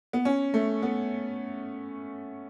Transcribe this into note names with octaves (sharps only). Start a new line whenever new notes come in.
B3
C#4
A3
B3